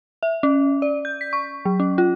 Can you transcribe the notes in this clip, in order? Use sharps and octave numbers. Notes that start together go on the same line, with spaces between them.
E5
C#4
D5
G6
B6
C#6
F#3
C#4
F4